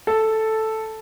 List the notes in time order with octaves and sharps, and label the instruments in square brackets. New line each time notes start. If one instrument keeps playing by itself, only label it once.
[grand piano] A4